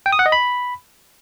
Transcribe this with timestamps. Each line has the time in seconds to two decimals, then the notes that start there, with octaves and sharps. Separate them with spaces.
0.06 G5
0.12 D#6
0.19 F#5
0.26 D#5
0.32 B5